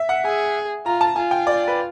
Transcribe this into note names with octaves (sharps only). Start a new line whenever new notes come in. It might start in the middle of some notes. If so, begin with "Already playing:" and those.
Already playing: E5
F#5
G#4 G#5
F4 A#5
A5
F4 G#5
G5
D5
B4